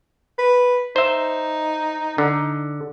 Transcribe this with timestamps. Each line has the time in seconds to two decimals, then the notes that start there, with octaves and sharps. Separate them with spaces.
0.38 B4
0.96 D#4 C5 E5
2.18 D3